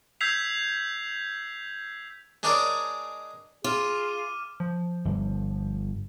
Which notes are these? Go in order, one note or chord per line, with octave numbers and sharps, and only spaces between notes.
E6 G6 G#6 B6 C7 F7
G#3 D4 G#4 A#4 C#5 D5
F4 G#4 D6 F6 D#7
F3
G1